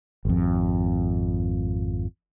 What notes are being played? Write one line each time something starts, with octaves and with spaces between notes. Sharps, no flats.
G#1 F2